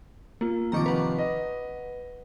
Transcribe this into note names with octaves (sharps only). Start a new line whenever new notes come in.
A#3 F4
C3 D#3 F3 A#5 C#6 D6
B4 F#5
D#5